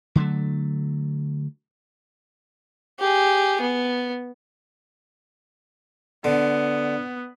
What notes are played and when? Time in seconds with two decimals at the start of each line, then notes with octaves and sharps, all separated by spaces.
0.16 D3 F#3 A3
3.00 G4 G#4
3.61 B3
6.24 D3 B3